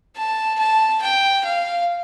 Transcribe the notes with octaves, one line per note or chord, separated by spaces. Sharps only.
A5
A5
G5
F5